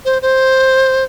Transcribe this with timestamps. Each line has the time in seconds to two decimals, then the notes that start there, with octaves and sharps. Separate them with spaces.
0.05 C5
0.22 C5